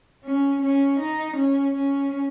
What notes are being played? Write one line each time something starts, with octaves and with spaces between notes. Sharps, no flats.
C#4
C#4
D#4
C#4
C#4